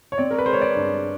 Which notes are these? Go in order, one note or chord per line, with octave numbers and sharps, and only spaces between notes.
C#5
C4 D5
A#4
B4
G#3 C5
C#5
D5
G2